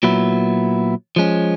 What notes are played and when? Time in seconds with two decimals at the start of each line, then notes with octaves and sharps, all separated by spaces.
0.03 A#2 F#3 B3 E4
1.16 F3 G#3 C#4